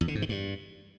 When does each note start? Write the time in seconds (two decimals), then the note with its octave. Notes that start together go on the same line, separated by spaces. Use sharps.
0.01 E2
0.08 D3
0.15 G#2
0.22 D#3
0.29 G2